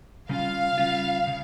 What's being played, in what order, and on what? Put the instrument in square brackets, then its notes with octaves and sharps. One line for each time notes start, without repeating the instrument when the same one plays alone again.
[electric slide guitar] C#3 G3 C#4 F4 [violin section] F5
[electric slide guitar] C#3 G3 C#4 F4
C#3